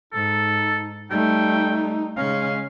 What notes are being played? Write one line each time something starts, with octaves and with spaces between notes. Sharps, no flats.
G#2 D#4 A4
G3 A3 D#4 G5
C#3 G#3 C#4 F5